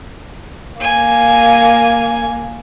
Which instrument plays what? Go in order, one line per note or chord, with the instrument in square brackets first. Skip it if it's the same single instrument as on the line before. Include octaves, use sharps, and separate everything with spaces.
[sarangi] A#3 [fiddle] G#5